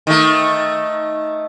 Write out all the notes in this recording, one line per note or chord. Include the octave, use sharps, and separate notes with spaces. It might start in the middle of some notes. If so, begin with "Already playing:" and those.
D#3 A3